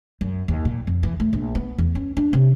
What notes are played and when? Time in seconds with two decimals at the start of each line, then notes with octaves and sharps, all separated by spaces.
0.21 F#2
0.48 D#2
0.65 A#2
0.87 F2
1.03 E3
1.20 A3
1.33 A#1
1.55 B3
1.78 E2
1.95 C#4
2.17 D4
2.33 C3